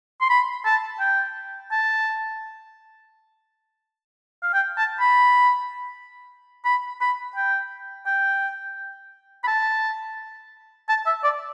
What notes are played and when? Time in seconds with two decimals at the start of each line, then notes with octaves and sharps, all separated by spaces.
0.21 C6
0.30 B5
0.66 A5
1.00 G5
1.72 A5
4.43 F5
4.54 G5
4.78 A5
5.00 B5
6.65 B5
7.01 B5
7.36 G5
8.06 G5
9.44 B5
9.48 A5
10.89 A5
11.06 E5
11.24 D5